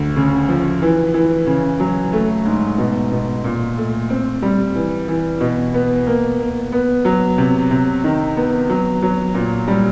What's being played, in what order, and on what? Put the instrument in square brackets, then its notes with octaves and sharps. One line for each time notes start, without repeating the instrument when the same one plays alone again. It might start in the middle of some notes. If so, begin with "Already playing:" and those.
Already playing: [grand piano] D2
C#3
F3
E3
E3
C#3
F#3
A3
G#2
B2
B2
A#2
A3
C4
G3
E3
E3
B2
B3
A#3
A#3
B3
F#3
C3
C3
D#3
B3
F#3
F#3
A#2
G3